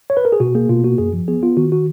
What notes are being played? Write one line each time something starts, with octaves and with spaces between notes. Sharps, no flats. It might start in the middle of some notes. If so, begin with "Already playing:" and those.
C#5
B4
A#4
G#4
B2 F#4
A#3 G#4
B2 F4
A#3 F#4
F#2 G#4
F3
B3 G#4
B3 F4
D#3 F#4
F#4